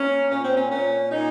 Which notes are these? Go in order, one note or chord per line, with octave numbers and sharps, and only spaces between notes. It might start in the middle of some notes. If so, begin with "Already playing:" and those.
Already playing: A#3 C#4
A#2 C#4
C4
C#4
A#2 C#4
A#2 D#4